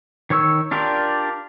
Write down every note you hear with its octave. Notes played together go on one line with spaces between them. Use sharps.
D#3 C#5 C#6 E6
D4 F4 G4 A#4 D5